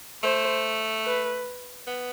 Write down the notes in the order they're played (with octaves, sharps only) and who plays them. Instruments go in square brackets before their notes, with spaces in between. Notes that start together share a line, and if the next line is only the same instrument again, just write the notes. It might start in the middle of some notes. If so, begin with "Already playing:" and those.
[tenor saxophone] A3 [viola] C5
[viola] B4
[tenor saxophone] B3